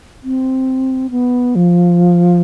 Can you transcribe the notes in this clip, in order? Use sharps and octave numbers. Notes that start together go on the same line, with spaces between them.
C4
B3
F3